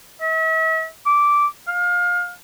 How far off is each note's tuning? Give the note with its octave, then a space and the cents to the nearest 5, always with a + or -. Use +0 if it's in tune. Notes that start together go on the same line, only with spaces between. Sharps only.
E5 -40
D6 -10
F5 +25